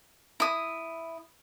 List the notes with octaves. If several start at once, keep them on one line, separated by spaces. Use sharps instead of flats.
E4 D#6